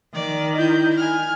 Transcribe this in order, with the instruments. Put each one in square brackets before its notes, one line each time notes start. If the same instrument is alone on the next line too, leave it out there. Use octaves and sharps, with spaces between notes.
[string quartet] D#3 [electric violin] D5
[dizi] E4 [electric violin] G6
[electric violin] G#5 F6